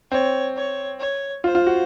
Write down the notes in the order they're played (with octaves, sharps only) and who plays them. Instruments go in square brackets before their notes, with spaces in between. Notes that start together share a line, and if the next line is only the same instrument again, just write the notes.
[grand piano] C4 [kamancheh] C#5
[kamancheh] C#5
C#5
[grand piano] F4 [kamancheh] C5
[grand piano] F4
F#4